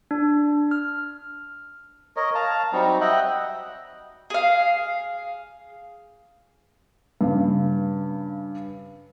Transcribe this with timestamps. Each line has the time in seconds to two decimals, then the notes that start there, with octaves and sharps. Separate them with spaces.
0.11 D4
0.71 F6
2.16 A#4 C#5 D#5
2.35 F5 A5 A#5
2.73 F#3 G3 C4 D#4
3.01 D#5 E5 F#5 G5
4.30 G#4 F5
7.21 G2 C#3